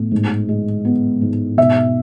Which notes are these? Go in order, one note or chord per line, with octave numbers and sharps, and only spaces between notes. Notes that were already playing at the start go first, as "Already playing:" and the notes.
Already playing: A2 B3
G#2
G#3
B3
G#2
B2 E5